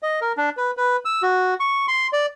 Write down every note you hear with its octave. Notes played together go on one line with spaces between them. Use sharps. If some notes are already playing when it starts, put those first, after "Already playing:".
D#5
A#4
D4
B4
B4
E6
F#4
C#6
C6
D5